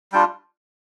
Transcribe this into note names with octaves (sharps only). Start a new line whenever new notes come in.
G3 D4 F4 G5